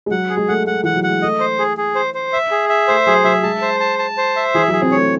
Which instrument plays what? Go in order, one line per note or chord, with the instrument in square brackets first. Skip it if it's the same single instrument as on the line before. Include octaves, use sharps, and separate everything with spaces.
[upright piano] G#3
[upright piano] F#3 [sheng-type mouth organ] F#5
[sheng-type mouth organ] G#4
[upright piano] G#3
[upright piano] A3 [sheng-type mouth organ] F#5
[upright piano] A3 [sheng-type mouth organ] F#5
[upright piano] E3 [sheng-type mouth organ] F#5
[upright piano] F#3
[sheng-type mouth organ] F#5
[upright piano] G#3
[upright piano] A3 [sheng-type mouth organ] D#5
[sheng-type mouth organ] C5
G#4
G#4
C5
C5
E5
G#4
E5
[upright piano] A3 [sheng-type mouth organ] C5
[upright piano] F#3 [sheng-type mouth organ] G#4
[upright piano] F#3 [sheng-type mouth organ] E5
[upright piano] G#3 [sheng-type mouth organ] A5
[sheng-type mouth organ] C5
A5
A5
C5
E5
[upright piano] E3 [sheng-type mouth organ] G#4
[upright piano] F#3
[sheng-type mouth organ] G#4
[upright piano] C4
[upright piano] A3 [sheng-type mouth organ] C#5